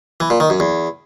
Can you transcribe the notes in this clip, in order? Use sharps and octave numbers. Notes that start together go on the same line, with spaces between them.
E3
A#2
D#3
F#2
E2